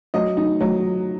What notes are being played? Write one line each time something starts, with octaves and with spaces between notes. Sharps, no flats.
F#3 D#5
D#4
F#3